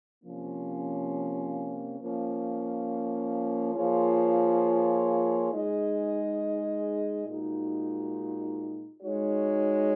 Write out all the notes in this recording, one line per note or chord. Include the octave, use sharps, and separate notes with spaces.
C3 F3 A#3 C#4
F3 A#3 C#4
F3 A#3 F4 G#4 C#5
G#3 D#4 G#4 D#5
A#2 G#3 D#4 F#4
G#3 D#4 F#4 C#5